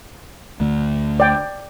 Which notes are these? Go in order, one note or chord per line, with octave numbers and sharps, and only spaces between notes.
D2 D3 A3
D5 G5